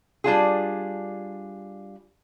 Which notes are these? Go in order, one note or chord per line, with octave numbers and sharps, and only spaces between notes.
G3 D4 F4 G#4